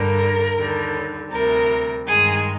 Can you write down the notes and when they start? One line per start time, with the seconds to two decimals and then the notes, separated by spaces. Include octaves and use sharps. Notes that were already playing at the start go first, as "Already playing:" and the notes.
Already playing: G2 D3 G3 A#4
0.56 D#2 D3 G3
1.31 D2 C3 G3 A#4
2.07 G2 D#3 G#3 G#4